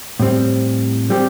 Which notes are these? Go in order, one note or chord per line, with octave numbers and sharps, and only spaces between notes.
A2 G3 C4
G3 C4 G4